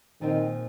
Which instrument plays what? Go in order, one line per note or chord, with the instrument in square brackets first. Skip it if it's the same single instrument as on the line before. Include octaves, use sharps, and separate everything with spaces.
[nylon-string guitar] A#2 F3 C4 D#4 [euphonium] D#3